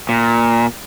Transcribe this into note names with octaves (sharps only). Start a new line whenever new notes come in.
A#2